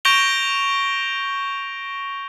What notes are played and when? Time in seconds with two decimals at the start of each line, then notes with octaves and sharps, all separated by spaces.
0.05 C#6 G6 A#6 D7 F7 G7